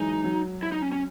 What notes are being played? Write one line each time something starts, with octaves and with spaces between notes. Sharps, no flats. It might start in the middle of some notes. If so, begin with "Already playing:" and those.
Already playing: E3 F#3 G#3 D#4
F#3
E4
D#4
C#4
C#4